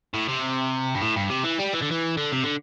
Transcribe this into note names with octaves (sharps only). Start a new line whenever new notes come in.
A2
C3
G2
A2
G2
C3
E3
G3
E3
D3
E3
D3
C3
D3